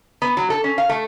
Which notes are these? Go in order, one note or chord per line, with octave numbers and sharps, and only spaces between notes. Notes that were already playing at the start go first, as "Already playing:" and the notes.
B3
F#3
A4
C#4
F5
A3